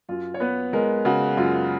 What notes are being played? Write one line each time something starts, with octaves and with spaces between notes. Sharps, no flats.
F#2 F4
C#5
B3 B4
G#3 A#4
C#3 F#4
F#2 F4